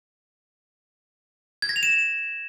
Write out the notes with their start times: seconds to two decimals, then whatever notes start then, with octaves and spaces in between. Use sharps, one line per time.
1.62 G#6
1.69 A#6
1.76 F7
1.83 E7